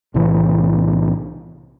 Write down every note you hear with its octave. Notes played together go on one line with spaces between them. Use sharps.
B1 A2 C3 E3